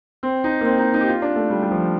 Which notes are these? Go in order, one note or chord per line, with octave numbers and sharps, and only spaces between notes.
C4
D#4
A#3
C4
D#4
D#4
G4
F4
D4
A3
G3
G3
F3